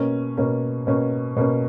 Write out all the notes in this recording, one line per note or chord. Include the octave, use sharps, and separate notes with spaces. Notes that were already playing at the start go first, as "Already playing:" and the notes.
Already playing: B2 A#3 C#4
B2 A#3 C#4
B2 A#3 C#4
B2 A#3 C#4